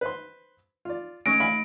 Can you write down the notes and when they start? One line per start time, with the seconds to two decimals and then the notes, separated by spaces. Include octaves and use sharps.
0.01 B4 C5 C6
0.85 F4 D5
1.26 A3 C#4 C#5 A#6 D7
1.40 F5 G#5 B5